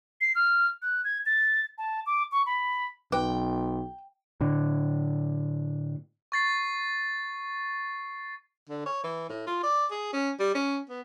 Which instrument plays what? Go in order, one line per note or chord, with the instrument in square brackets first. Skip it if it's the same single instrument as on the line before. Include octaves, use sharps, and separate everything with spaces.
[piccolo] C7
F6
F#6
G#6
A6
A5
D6
C#6
B5
[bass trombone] B1 [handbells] B4 D6 [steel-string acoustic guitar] G5
[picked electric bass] A2 D3
[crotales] C#6 A6 C7
[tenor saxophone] D3
C#5
E3
A2
F4
D5
G#4
C#4
G3
C#4
B3